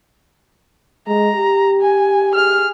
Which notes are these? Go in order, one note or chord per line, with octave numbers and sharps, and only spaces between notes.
G#3 A#5
G4
G#5
G#4 F6